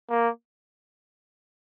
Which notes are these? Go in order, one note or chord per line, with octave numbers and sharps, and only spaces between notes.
A#3